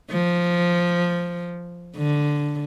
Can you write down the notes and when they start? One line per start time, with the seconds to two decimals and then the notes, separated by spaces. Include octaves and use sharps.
0.11 F3
1.96 D3